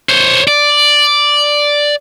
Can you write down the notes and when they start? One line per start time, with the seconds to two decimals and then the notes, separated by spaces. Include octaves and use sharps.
0.09 C5 C#5
0.48 D5